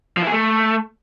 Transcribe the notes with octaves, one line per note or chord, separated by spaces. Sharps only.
F3
E4
G#4
A3